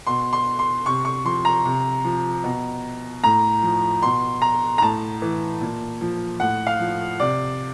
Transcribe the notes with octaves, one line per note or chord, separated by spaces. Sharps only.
B2 C6
C6
C6
C3 C#6
C#6
F3 C6
A#5
C3
F3
B2
A2 A#5
F3
B2 C6
A#5
A#5
A2 A5
E3
A#2
F3
A2 F#5
F5
F3
C3 D5